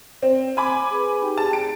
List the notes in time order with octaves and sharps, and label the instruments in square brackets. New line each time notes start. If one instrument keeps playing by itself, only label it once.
[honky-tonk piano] C4
G#5 B5 D6
[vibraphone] G#4 B4
D#4 G4 G5
[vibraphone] G#4 [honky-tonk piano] A5
[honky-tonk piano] D7